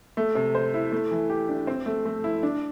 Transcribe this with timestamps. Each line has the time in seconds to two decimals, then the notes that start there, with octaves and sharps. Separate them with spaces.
0.17 A3
0.35 C3
0.55 C5
0.74 E4
0.92 A3
1.11 E3
1.30 G4
1.49 D4
1.67 C4
1.86 A3
2.05 A3
2.24 E4
2.43 D4